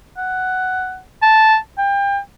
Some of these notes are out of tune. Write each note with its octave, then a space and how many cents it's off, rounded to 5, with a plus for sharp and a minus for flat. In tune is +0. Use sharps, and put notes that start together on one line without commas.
F#5 +10
A5 -5
G5 +30